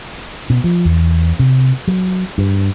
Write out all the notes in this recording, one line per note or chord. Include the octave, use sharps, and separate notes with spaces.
B2
F3
E2
C3
F#3
G2